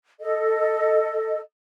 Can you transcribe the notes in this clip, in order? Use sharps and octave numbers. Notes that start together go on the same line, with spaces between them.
A4 D#5